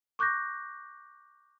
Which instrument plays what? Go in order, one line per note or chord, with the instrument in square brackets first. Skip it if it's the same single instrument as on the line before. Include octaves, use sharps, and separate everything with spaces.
[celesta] C#6 D6 F#6 G6 A#6